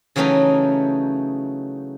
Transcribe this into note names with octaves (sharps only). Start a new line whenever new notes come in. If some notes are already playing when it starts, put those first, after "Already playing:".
C#3 E3 F#3 A3 C#4 D#4